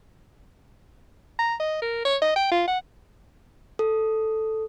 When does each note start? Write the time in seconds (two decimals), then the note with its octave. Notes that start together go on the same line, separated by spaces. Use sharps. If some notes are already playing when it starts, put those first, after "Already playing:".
1.39 A#5
1.60 D#5
1.82 A#4
2.05 C#5
2.22 D#5
2.36 G5
2.51 F4
2.67 F#5
3.79 A4